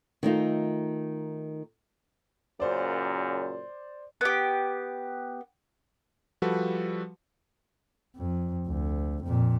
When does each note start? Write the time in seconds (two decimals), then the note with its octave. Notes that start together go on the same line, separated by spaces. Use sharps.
0.23 D#3 A3 D#4 F4
2.60 F#2 A#2 C#3 C5 D5
4.21 B3 G4
6.42 F3 G3 F#4 A4 B4
8.16 F2
8.67 D2
9.24 F2 A#2